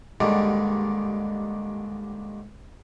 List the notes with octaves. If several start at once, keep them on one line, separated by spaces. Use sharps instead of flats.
D#2 G#2 D3 D#3 G3 G#4